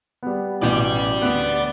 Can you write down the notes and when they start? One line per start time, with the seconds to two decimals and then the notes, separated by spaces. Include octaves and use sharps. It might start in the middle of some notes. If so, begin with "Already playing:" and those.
0.23 G3 B3
0.62 A1 B2 E3 D5 G5
1.22 D2 B3